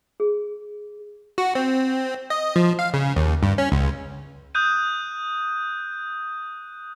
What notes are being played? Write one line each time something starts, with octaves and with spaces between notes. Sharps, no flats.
G#4
F#4
C4
D#5
F3
F5
C#3
D#2
G2
C#4
C#2
D#6 F#6 G6 D#7